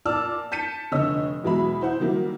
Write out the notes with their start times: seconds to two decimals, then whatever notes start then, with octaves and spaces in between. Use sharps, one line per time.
0.05 A#2 D5 A5 D6 E6 F6
0.52 A5 G6 B6 C#7 D#7
0.92 F1 D3 C#5 D#5 E6
1.44 E2 B2 F#3 G#3 E5 B5
1.81 E4 C5 F#5
2.00 D#3 F#3 G3 A#3 E4